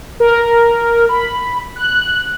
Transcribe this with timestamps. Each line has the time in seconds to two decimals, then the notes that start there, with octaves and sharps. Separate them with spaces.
0.20 A#4
1.09 B5
1.76 F#6